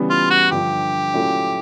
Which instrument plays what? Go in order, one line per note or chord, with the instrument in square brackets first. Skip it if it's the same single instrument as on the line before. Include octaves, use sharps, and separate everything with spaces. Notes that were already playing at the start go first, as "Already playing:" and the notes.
Already playing: [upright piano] C#3 E3 G3 B3
[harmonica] F4
F#4
[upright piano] G2 D3 F3 [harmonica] G4
[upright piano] A#2 F#3 A3 C#4 E4